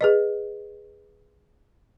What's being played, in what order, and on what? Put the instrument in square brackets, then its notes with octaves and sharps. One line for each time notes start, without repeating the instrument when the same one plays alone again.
[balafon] G#4 B4 D#5